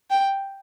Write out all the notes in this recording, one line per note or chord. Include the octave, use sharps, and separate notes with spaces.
G5